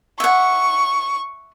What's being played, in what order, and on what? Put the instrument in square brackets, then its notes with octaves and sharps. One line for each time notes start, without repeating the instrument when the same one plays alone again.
[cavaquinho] E5 F#5 [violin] C#6